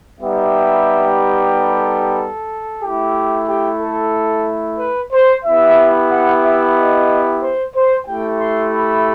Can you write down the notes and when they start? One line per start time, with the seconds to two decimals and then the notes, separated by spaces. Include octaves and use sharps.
0.19 G3 B3 D#4 G4 E5
1.50 A4
2.82 A3 E4 G4
3.48 G4
3.80 A4
4.79 B4
5.12 C5
5.45 B3 E4 G4 E5
6.10 F#5
6.43 E5
6.76 D#5
7.42 C5
7.75 C5
8.07 A3 E4 G4 G5
8.40 C6
8.73 B5